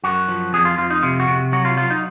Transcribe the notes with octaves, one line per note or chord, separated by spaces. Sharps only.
F#2 F#4
F3
F2 G#4
F4
F2 F4
D#4
C3 F4
F#4
C3
F#3 F#4
F4
F#3 F4
D#4